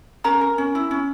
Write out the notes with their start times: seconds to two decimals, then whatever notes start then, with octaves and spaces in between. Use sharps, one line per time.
0.24 C#4 A#4 A#5
0.41 A#4
0.58 C#4
0.75 E4
0.91 C#4